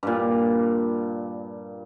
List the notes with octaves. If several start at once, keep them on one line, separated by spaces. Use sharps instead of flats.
G2 A#2